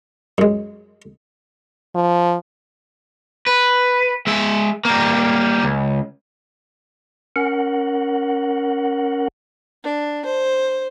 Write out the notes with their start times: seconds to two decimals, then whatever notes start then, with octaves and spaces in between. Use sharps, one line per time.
0.38 F#2 G#3
1.95 F3
3.46 B4
4.27 G#3 E5
4.85 G3 A#3
5.64 C#2
7.36 C#4 A#4 F#5
9.84 D4
10.25 C5